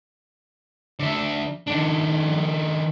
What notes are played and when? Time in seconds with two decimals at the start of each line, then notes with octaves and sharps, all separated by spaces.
0.99 D3 E5
1.67 D#3 D4